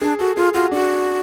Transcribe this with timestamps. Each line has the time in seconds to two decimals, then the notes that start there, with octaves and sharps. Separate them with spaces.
0.01 D4 G#4
0.19 F#4 A4
0.37 F4 G#4
0.54 F4 F#4
0.71 D4 F#4